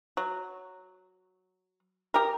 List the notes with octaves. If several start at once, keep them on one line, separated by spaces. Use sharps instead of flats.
F#3
G4 A#4